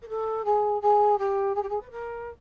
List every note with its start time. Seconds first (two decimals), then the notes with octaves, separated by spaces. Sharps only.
0.02 A#4
0.09 A4
0.45 G#4
0.81 G#4
1.18 G4
1.55 G#4
1.62 G4
1.69 G#4
1.81 B4
1.91 A#4